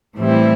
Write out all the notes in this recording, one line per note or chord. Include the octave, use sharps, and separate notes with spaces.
A2 E3 G3 C4 E4